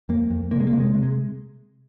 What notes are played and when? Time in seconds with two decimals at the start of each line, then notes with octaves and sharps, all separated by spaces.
0.09 F2 A#3
0.30 F2
0.51 C3 A#3
0.60 G#3
0.67 A#3
0.73 C3
0.80 G#3
0.94 C3
1.03 G#3